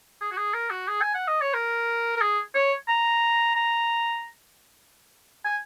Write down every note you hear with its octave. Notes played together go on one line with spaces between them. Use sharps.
G#4
F#4
G#4
A#4
F#4
G#4
G#5
F#5
D#5
C#5
A#4
A#4
G#4
C#5
A#5
A#5
G#5